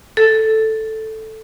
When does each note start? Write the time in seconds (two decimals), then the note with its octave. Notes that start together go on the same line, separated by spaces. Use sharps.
0.17 A4